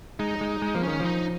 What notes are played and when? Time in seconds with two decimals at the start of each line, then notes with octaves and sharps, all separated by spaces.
0.19 G#3 D#4
0.41 G#3
0.62 G#3
0.75 F3 A#3
0.83 D#3 C#4
1.00 F3 D#4